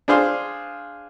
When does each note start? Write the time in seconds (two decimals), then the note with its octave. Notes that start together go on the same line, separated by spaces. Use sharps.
0.08 D4 G#4 C5 F5 C6